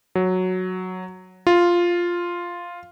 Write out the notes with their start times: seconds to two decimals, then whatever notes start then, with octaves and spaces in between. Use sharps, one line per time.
0.15 F#3
1.47 F4